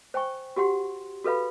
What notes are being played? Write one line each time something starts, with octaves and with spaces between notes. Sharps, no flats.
C5 G5 G#5 C#6
F#4 G4 F#5 C6
F#4 A4 B4 F5 B5